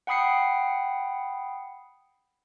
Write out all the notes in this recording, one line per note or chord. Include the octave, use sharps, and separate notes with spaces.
F#5 G5 B5 D#6 C7 C#7